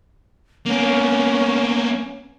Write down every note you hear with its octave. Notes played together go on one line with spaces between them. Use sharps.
A#3 B3 C#4